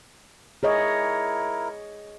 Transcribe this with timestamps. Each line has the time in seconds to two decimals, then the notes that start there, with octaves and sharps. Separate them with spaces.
0.63 E4 G#4 A#4 C#5 D#5